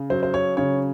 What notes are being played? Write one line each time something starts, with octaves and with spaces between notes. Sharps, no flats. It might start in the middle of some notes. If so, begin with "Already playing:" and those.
Already playing: C#3
F#3 C5
C5
C#5
C#3 C#5